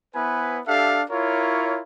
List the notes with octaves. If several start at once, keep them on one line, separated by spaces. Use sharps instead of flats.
B3 E4 B4 C5 G#5
D4 G4 A4 E5 F5
E4 F4 A#4 C#5